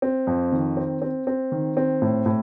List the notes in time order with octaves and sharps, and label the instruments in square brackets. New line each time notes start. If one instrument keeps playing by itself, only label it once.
[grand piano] C4
F2
D#3
C4
C4
C4
D#3
C4
A2
A2